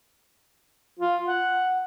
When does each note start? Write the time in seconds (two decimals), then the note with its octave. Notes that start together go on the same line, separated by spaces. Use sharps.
0.99 F4
1.26 F#5